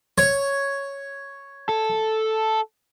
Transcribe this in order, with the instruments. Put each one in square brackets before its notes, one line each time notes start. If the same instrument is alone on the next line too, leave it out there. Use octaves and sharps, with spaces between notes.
[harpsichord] C#5
[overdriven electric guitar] A4